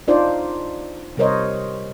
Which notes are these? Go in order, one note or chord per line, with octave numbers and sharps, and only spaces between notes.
D4 D#4 F4 C5 D5
C3 G3 A#4 C5 C#5 D#5